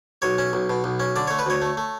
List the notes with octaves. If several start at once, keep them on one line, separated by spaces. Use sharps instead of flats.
B1 C#5
C#4
B1
B2
B1
C#4
D3 D5
A3 C#5
B4
D2 C#5
A3
A3